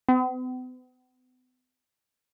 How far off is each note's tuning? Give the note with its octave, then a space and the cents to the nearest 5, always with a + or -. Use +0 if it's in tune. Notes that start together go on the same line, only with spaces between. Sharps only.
B3 +45